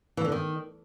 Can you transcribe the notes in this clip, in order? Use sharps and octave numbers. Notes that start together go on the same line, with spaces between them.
E3
D3
D#3